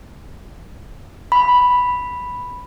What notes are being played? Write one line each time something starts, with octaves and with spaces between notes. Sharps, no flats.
B5